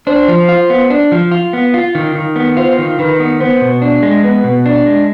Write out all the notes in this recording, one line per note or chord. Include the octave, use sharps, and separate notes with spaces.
D4 C5
F3
F4
B3
D4
F3
F4
B3
F4
D#3
D#3
B3
F4 C5
D#3
D#3 B4
B3
B3 C5
B2
D4
G#3
B3 B4
B2
D4
G#3